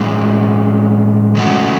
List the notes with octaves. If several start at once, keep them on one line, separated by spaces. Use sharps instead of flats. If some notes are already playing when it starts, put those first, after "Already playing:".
Already playing: A2 E3 G#3 C#4
C#3 E3 A3 C#4 F#4